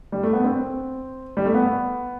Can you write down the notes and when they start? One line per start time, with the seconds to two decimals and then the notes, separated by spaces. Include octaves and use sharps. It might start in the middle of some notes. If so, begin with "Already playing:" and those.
0.12 G3
0.23 A3
0.33 B3
0.44 C4
1.37 G3
1.46 A3
1.54 B3